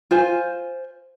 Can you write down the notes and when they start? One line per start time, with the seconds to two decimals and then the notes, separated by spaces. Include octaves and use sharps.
0.11 F4 C5 G#5